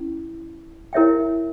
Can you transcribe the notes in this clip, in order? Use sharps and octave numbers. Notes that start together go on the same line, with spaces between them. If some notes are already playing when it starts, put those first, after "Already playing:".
Already playing: C#4 E4
E4 A#4 C#5 E5 G5